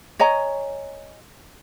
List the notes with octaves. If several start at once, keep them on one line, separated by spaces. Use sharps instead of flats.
C#5 D#5 G#5 A#5